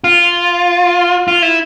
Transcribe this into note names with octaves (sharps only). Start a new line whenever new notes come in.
F4
F4
E4